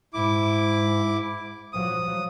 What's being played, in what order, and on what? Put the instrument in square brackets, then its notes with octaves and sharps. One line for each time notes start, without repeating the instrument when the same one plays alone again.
[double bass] G#2 [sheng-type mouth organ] E4 D6
[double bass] F3 F#3 [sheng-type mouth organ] D#6